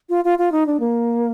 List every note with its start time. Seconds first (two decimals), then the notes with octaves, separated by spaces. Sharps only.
0.09 F4
0.24 F4
0.38 F4
0.52 D#4
0.66 D4
0.80 A#3